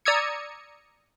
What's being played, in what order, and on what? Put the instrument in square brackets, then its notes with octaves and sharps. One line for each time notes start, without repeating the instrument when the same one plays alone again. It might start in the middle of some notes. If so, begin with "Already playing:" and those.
[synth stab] D5 A#5 D#6 E6 G#6 C#7